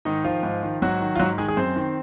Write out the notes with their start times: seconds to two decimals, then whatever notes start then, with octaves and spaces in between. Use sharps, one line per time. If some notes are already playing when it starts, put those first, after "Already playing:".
0.05 G#2 D#3 D#4
0.24 D#3 F3 F4
0.43 G#2
0.63 D#3
0.82 G#2 F#3 F#4
1.01 D#3
1.16 F4
1.19 G#2 F#3 F#4
1.38 D#3 G#3 G#4
1.48 G#3 G#4
1.57 F#2 C4 C5
1.76 D#3